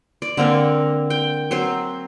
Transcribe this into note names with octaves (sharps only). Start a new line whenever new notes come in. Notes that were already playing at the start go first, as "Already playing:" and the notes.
D5
D3 A#3 C4 A#4
G5
F#3 C4 C5